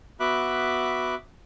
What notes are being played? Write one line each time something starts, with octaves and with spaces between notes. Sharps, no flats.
B3 F#4 E5 B5 D6 F#6